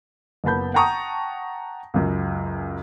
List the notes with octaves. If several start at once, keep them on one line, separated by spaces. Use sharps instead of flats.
F#1 A#3 B3 A5 B5 G6
F#5 G5 A5 A#5 C#6 D#6
C#2 F#2